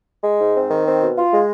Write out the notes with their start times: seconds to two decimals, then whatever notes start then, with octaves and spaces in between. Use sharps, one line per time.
0.23 G#3
0.38 G#2
0.54 C4
0.69 D#3
0.85 C4
1.00 B2
1.16 F4
1.32 G#3